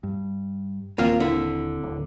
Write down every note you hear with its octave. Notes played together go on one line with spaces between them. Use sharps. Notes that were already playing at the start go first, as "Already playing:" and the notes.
G2
D#1 B2 A#3 C4 F4 F5
D3 E4
D1